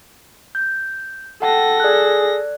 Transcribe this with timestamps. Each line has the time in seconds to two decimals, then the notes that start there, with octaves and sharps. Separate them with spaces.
0.55 G6
1.42 A4 F#5 G5 A5 A#6
1.80 G#4 D5 F#6